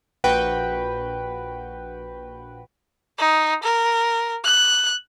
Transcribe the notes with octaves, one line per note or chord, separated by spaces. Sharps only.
A#1 F#4 B4 G5
D#4
A#4
F#6